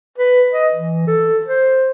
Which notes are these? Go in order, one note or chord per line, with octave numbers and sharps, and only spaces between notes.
B4
D#5
E3
A4
C5